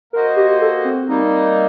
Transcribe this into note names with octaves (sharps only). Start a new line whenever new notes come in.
A#3 F#4 A#4 C5 D#5
G4
A4
C4
G3 A#3 D#4